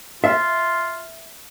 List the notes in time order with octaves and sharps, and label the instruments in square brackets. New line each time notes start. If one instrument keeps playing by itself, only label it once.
[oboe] F4 [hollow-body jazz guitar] E5